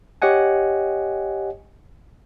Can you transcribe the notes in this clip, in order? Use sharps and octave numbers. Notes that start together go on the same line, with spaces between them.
G4 C#5 D#5 F#5 G#5